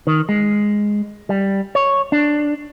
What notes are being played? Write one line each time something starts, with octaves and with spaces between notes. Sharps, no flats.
D#3
G#3
G3
C#5
D4